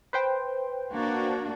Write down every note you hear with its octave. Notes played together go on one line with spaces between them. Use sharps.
B4 C5 G5
A#3 D4 F#4